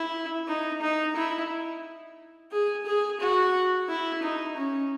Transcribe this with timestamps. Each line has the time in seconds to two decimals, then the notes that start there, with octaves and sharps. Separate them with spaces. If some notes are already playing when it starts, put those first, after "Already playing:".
Already playing: E4
0.48 D#4
0.82 D#4
1.16 E4
2.52 G#4
2.86 G#4
3.21 F#4
3.89 E4
4.23 D#4
4.57 C#4